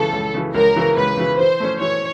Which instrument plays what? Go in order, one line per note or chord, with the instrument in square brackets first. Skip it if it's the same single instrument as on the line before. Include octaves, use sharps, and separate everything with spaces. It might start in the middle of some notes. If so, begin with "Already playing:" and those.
Already playing: [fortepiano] C#2 C#3 E3 [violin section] A4
[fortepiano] C#2
C#3 E3
[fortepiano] C#2 [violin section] A#4
[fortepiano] C#3 E3
[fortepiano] C#2 [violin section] B4
[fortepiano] C#3 E3
[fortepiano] E3 [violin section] C5
[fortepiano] A3 C#4
[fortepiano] E3 [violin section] C#5